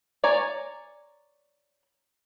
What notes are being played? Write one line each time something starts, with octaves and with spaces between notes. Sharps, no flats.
C#5 D5 G#5 A#5